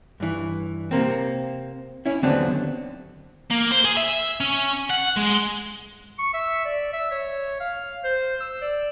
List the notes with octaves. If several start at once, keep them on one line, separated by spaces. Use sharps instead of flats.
G2 E3
C3 A#3 C4
C#4 E4
D#2 D3 F#3 B3 C4 D4
A#3
C5
G#4
E5
C#4
F#5
G#3
C#6
E5
D5
E5
C#5
F5
C5
E6
D5